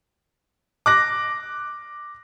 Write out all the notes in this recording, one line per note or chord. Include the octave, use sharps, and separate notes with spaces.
D6 F#6 A#6